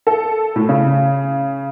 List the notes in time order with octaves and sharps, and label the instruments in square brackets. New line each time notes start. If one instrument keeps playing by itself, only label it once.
[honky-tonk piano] A4
A2
C#3